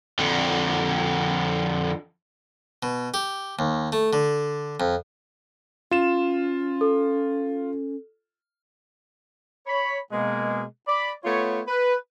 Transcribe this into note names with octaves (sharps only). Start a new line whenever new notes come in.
F2 D3
B2
G4
D#2
A3
D3
F2
C#4 F4 E7
A4
C#5 B5
B2 G#3 A#3
D5 B5
A3 B3 F4 C#5
B4